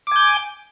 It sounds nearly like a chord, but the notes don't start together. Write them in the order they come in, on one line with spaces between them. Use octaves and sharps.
D6 G#5 G6